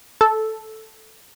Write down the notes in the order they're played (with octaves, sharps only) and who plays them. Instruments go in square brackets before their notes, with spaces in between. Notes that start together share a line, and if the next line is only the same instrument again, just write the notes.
[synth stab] A4